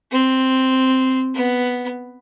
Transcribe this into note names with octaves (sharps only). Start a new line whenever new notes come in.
C4
B3